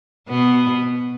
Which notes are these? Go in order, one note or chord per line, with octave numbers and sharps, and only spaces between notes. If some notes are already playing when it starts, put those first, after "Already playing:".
B2 B3